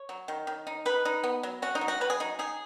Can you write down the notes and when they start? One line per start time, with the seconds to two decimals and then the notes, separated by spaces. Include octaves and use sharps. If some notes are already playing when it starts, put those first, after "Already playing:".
Already playing: C#5
0.09 F#3
0.28 D#3
0.47 D#3
0.67 D#4
0.85 D#4 B4
1.05 D#4
1.24 B3
1.43 F#3
1.62 C#4 F#4
1.75 D#4
1.81 F#3
1.88 F#4
2.01 F#3 B4
2.10 G#4
2.20 F#3 D#4
2.39 D#4 G#4